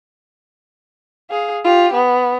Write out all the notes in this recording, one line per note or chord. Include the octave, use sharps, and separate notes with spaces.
G#4 F5
F4 G4
B3